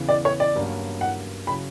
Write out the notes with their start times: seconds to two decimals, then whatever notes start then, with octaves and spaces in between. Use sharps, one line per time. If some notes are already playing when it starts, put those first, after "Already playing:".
Already playing: E2 C#3 E3 B3
0.09 D5
0.25 C#5
0.40 D5
0.56 G2 F#3 A#3 C#4 F#4
1.01 F#5
1.47 C#3 F#3 B5